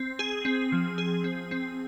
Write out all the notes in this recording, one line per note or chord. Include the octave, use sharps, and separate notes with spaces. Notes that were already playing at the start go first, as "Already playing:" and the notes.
Already playing: C4
G#4
C4
F3
G#4
C4
C4